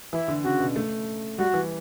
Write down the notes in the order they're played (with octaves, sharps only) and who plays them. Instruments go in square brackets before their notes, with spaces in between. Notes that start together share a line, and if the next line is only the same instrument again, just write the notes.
[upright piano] E3 [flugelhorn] E4
[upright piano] D3
[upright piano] C#3 [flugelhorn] F#4
[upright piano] B2
A3
[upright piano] G3 [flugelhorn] F#4
[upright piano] E3